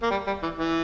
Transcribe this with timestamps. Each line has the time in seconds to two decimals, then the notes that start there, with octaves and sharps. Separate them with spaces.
0.03 A#3
0.11 G3
0.27 G3
0.43 E3
0.58 E3